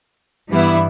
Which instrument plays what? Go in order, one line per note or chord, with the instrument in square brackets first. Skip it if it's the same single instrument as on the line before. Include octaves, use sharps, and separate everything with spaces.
[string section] G2 E3 G3 B3 E4